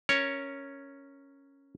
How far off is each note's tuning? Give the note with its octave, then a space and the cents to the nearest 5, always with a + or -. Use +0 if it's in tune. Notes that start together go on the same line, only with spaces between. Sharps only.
C#4 +0 A#4 +0 C#5 +0